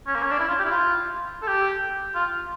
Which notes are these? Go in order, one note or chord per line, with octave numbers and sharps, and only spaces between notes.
C#4
A#3
C#4
D4
E4
F4
G4
E4
F4
A4
G4
F4